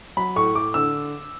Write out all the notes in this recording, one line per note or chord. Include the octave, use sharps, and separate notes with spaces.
F#3 B5
A2 C#6
A2 D6
D3 E6